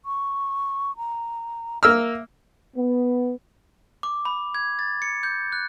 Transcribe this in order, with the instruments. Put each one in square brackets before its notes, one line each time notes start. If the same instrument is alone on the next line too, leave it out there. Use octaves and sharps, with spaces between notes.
[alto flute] C#6
A#5
[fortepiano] A#3 E6 F6 [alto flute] E5
[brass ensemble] B3
[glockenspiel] D6
B5
G#6
A6
C#7
G6
F#6